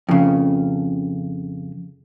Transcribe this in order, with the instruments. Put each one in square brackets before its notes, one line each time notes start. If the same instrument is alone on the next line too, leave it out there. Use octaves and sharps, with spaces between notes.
[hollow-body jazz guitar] F2 C#3